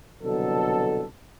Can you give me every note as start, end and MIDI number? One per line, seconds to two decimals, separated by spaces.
0.23 1.04 36
0.23 1.04 47
0.23 1.04 50
0.23 1.04 54
0.23 1.04 69